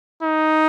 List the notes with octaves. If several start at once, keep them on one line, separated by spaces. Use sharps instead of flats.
D#4